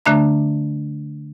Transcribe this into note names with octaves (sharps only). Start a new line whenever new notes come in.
D3 A3 D4 E5 A#5